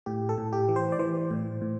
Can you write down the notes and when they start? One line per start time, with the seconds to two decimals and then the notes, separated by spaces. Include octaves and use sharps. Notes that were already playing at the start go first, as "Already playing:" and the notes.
0.06 A2 G4
0.29 A4
0.38 A2
0.53 G4
0.68 E3
0.76 C5
0.92 D5
0.99 E3 C5
1.31 A2
1.62 A2